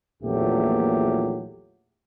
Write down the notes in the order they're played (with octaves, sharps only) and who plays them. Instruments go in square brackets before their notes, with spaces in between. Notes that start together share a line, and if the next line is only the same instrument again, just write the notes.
[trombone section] A#1 E2 A#2 F#3 A3 G4